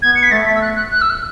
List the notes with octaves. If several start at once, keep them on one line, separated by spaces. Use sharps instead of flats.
B3 G#6
C#7
B6
A3 A6
B6
E6
F#6
F#6
F#6
E6
F#6